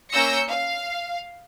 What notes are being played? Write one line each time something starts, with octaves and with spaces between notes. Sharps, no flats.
A#3 C#4 E6 G6 A#6 C#7
F5